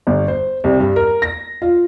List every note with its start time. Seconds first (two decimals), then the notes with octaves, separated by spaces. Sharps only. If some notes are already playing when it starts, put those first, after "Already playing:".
0.07 G1
0.28 C5
0.64 C2
0.80 G2
0.96 A#4
1.22 A#6
1.62 F4